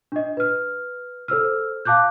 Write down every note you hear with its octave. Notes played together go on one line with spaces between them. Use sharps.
D4 D#5
B4 F6
A4 C5 E6 F6
F5 A5 D6 F#6 G6